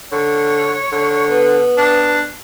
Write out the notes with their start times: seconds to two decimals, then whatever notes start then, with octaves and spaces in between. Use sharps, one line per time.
0.12 D3 C#5
0.92 D3
1.30 B3
1.78 D4